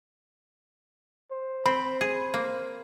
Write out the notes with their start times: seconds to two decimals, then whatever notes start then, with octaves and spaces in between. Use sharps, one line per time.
1.32 C5
1.66 C4 B5
2.01 G#4
2.34 A#3